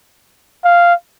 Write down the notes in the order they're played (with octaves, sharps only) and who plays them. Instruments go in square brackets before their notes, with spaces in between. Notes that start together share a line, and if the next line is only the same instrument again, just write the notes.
[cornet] F5